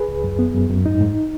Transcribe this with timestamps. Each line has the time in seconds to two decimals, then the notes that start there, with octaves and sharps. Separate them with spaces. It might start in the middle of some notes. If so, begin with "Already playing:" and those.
Already playing: G#4 B4
0.08 C#2
0.24 F#2
0.39 B3
0.55 F#2
0.70 F#2
0.85 G#2 D#4
1.00 G#2